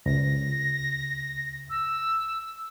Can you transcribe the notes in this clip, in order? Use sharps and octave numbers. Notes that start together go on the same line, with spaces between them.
C#2 A#6
E6